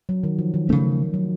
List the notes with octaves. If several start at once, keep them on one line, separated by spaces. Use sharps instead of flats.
F#3
D#3
F3
D#3
C#3 A3 C#4
F#3